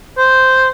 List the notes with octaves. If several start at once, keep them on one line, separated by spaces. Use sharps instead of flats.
C5